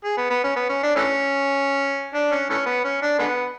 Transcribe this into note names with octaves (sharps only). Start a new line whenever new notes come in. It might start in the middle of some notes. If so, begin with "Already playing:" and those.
G#4
B3
B3
C#4
B3
C#4
D4
E3 A3 C#4
D4
C#4
E3 A3 C#4
B3
C#4
D4
D3 G#3 B3